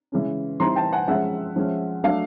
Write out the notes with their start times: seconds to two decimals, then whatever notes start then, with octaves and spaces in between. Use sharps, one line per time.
0.12 C#3 E3 G#3 C#4
0.60 E3 G3 C4 D#4 A#5 C6
0.76 G5 A5
0.93 F#5 G#5
1.08 F3 G#3 C#4 E5 F#5
1.56 F3 G#3 C#4
2.04 F#3 A3 D4 F5